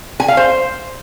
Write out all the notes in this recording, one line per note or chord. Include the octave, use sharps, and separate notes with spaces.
G#5
F5
C5